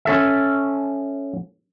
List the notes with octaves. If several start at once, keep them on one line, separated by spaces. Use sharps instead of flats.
C#4 A4 E5